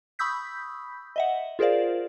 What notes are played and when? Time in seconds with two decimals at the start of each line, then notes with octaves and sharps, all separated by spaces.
0.19 B5 C#6 D#6 E6 G6 B6
1.16 D#5 E5 F#5
1.59 F4 G#4 A#4 C5 D5 F5